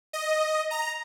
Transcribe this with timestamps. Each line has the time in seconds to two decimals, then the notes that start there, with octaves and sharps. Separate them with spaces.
0.13 D#5
0.71 A#5